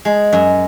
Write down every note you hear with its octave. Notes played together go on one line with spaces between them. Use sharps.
G#3
F#2